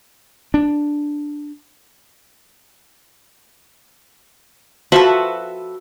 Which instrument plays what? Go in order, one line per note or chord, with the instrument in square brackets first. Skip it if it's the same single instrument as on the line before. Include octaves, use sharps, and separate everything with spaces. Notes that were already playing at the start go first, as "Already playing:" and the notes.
[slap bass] D4
[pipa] F3 C4 A4 [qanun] F#4 B4 E5